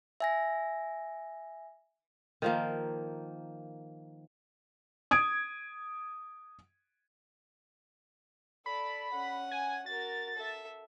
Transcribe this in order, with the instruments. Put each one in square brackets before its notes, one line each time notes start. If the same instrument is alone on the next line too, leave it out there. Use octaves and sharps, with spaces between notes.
[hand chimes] E5 G#5 A#6
[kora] D#3 F3 A#3
[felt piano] D#6 G#6 D7
[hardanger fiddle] A4 D5 [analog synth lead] B5
[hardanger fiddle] C#4 F#5
[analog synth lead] G#5
[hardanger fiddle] F#4 A#4 [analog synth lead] A6
[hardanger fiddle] A4 E5